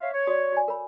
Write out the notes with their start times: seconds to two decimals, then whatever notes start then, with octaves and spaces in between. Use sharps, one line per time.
0.01 C#5 E5 F5
0.13 C#5
0.27 F#4 D5 D#6
0.52 F#4 D5 G#5
0.68 A#4 C#5 B5